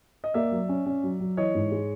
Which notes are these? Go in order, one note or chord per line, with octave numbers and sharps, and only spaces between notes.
D#5
A#3 D5 E5
F#3
C#4
C#4
F#3
F#3
E3 C#5 D#5
G#2
G#3